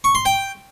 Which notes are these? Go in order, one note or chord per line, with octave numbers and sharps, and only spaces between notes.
C#6
C6
G5